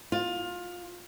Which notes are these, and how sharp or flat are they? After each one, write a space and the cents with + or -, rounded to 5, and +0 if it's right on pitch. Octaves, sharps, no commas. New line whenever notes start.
F4 +20